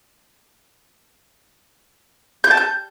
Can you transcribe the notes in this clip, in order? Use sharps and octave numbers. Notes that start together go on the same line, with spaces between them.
G6
A5
G6